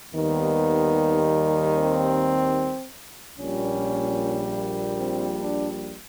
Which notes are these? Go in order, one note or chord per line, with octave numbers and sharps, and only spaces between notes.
D#2 D#3 G3 B3
C4
A#1 A#2 G3 C#4
C4
D4